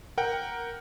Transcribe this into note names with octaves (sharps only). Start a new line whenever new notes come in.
A#4 F#5 G5